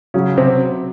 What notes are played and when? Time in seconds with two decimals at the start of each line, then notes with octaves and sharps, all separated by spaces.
0.14 C#3 F#3 C#4
0.38 C3 C4